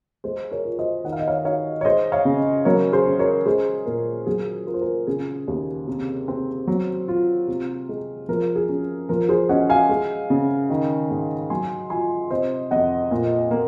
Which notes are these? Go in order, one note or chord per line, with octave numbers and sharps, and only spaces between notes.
G#3 G#4 C5
A#4 C#5
F4
C5 D#5
D#3 F#5
F5
D#5
C#5 F5
D#4 C#5 F5
C#5
G#3 C5 D#5
C#5 F5
C#3
F#3 A#4 C#5
G#4 C5
C#4
A#4 C#5
G#3 G#4 C5
A#2 A#4
F#3 G#4
F4 A#4
C5
A#4
C#3 G#4
D#2
C3
C4
F#3
F4
C3
G#3
F3 A#4
G#4
C#4
F3 A#4
G#4 C5
C#4 D#5 F#5
F5 G#5
G#3
C#3
D#3
G#2
F#3 G#5 C6
F4 G#5 C6
C3 C5 D#5
F2 D#5 F#5
A#2
A#3